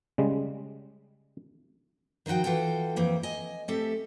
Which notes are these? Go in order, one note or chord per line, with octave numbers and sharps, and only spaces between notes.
C#3 G3 G#3
D#3 F3 D#4 F#4 G5
E3 F4 F#4 A4 G5
F2 E3 A#3 G5
D#5 G#5
A3 C4 G4 A4 E5